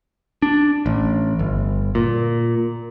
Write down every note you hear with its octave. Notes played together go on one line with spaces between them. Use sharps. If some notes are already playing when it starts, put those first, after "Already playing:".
D4
A1
G1
A#2